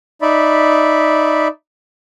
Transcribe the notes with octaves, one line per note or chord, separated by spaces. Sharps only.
D#4 D5 E5 B5